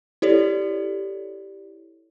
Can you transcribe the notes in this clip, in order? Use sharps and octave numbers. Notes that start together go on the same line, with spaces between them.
E4 G4 A4 C#5 D5